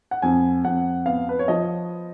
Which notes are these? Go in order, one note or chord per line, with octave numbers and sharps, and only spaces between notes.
F#5
F2 G#5
F2 F#5
B3 F5
B4
C#5
F3 D#5